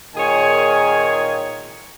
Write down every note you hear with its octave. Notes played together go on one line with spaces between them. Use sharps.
A#2 D#3 G#4 C#5 G#5